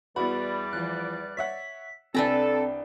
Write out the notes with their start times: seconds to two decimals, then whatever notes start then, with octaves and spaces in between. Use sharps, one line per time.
0.16 E2 G3 B3 E4 F#4 D5 B5
0.73 E3 F3 F#6
1.37 C#5 E5 F#5 B6
2.15 C2 C4 D4 A4 B4 G5 G#5 A#5